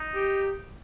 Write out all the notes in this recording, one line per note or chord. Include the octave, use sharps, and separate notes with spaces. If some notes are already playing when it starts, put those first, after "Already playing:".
Already playing: D#4
G4